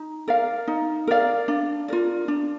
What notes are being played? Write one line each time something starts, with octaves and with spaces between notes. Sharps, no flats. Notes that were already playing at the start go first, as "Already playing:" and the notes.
Already playing: D#4
A#4 D5 F5
D#4
A#4 D5 F5
D4
F4 A#4 D5
D4